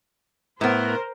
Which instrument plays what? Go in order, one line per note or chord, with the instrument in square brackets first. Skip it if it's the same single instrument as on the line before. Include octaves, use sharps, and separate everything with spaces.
[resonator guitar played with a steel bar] A2 B3 [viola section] A#4 C5